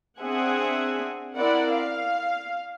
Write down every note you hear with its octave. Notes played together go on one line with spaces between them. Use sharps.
C4 D4 G#4 E5 F#5 G#5
C4 E4 A#4 D5 F#5
F5